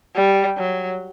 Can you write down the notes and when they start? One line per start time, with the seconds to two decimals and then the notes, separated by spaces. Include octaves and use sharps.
0.15 G3
0.57 F#3